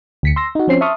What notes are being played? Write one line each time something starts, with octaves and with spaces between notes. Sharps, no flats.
D2 B6 C#7
C6 E6 A#6
D#4 F#4
F3 C4 C#4 C5 C7
E5 A5 C6 C#6 D#6 F6